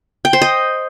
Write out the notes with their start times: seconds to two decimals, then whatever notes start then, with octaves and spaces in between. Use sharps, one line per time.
0.25 G5
0.33 C5
0.42 D#5